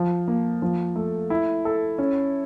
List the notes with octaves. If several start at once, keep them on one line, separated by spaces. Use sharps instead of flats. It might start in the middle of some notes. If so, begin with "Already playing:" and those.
Already playing: F3
A#3
F3
A3
E4
A4
C#4